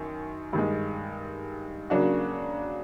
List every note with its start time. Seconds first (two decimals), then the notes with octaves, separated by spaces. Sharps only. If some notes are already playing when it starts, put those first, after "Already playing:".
Already playing: F#2 D#3
0.53 G2 D#3 G#3
1.90 C#3 F#3 A#3 D4 F#4